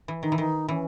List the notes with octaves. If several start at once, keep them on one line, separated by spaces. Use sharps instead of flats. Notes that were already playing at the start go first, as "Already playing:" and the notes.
E3
D#3 D#4
E3
D#3 D#4
E3 C#4